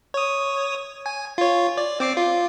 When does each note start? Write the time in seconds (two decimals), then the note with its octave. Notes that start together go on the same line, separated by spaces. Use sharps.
0.14 C#5 D#6
1.06 G#5
1.38 F4 C#5
1.77 D5
2.00 C4 D6 C7
2.17 F4